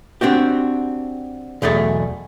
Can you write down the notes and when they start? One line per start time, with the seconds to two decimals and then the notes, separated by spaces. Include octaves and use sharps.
0.21 C4 D4 F#4 G4
1.62 B1 E2 A3 G#4 D5